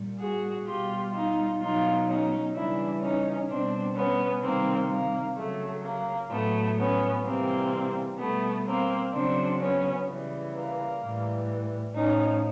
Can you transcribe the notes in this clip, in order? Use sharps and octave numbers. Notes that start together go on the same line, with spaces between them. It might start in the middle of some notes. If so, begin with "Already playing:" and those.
Already playing: A#2 G3
F#4 G#4
B2 G3 F4 G4
D#4 F4
B2 F#3 D#4 F4
C#4 D#4
C#3 E3 G3 D4 E4
C#4 D#4
B2 G3 C4 D4
B3 C#4
C3 D#3 G3 A#3 C4
A#3
C#3 F#3 A3
A#3
A2 F#3 A3 B3
B3 C#4
C3 E3 G3 A#3 C4
B2 G3 A3 B3
A#3 C4
C#3 F#3 C4 D4
B3 C#4
C#3 E3 G3
A#3
A2 E3 G3
A2 F3 C#4 D#4